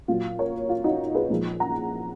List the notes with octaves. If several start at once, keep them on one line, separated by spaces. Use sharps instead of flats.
A#2 F#3 F4
A#4 C#5
F4
D#4 F#4
G#4 B4
A#2 F3 G#3
F#5 A#5